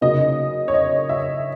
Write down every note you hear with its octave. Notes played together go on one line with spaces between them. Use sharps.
C#3 F#3 A#3 D#4 D#5
C#5
D#5
E5